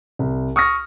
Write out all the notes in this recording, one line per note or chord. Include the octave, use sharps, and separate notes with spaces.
C2
C#6 D#6 F6 A#6